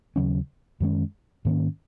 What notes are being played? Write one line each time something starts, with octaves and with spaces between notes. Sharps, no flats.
D#2 C#3 F#3 C#4
F#2 D#3 G#3 C#4
G#2 D#3 A#3 C#4